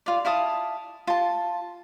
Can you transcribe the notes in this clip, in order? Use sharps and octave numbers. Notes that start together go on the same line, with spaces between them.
F4 D5
E4 F5 A5 D#6
F4 A5